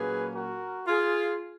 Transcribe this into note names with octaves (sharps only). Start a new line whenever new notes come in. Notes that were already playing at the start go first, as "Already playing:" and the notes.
Already playing: A#2 F#3 A#3 C#4 G#4 B4
F#4 A#4
F4 G#4